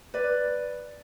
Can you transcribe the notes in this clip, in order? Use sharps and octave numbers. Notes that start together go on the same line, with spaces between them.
B4 D5